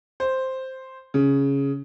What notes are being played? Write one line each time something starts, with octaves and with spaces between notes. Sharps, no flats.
C5
C#3